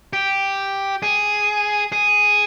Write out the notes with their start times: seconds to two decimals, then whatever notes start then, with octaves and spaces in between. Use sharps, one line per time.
0.13 G4
1.02 G#4
1.92 G#4